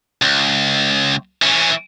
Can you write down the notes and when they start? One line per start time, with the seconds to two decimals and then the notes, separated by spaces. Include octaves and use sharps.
0.22 C#2
1.42 E3 C#4